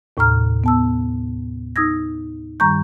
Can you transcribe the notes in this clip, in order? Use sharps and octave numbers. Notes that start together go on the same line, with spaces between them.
D#2 A2 C3 A#5 F6
B3 A5 E6
D#4 D#6 E6 G#6 A#6
G2 D#3 G3 A#5 C#6 G6